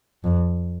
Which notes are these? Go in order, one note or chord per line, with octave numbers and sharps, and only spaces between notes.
F2